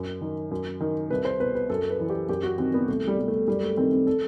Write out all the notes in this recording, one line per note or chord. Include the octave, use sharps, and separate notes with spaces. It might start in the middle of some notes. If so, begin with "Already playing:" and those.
Already playing: F#2
D#3
F#2
D#3
C2 B4
C5
B2 B4
B4
F#2 A4
B4
E3
G4
F#2 G4
F#4
D#3 C4
B3
C2 A3
G3
B2 G3
A3
F#2 G3
A3
D#3 C4
C4
A4